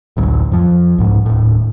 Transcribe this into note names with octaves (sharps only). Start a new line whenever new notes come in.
A1 D2 F#3
F2 F3
C2 G#2
D#1 A2